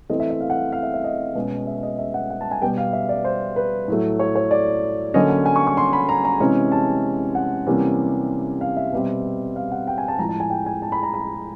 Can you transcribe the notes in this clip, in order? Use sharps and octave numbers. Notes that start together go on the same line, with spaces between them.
E3 A3 C4 D#5
E5
E5
F5
F#5
F5
F5
E5
E5
D#5
B2 G#3 C#4
E5
D#5
E5
F#5
F#5
A5
G#5
B2 G3 B3 G5
F5
E5
D5
C5
B4
A2 F#3 A3
C#5
C#5
D5
D3 F#3 A#3 C#4 D#5
G#5
G#5
C#6
C#6
C6
B5
A#5
A#5
C3 E3 G#3 C#4
A5
F#5
C3 E3 G3 A#3 C#4
F5
E5
B2 G3 C4
F5
F#5
G5
G#5
A5
A2 F3 G#3 A#5
A5
G#5
G5
G#5
A5
B5
A#5
B5